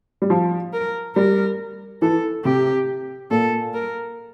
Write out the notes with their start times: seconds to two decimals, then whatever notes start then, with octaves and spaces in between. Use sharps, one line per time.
0.22 G3
0.30 F3
0.73 A#4
1.16 G3 A#4
2.02 E3 A4
2.45 C3 G4
3.31 A#2 A4
3.74 A#4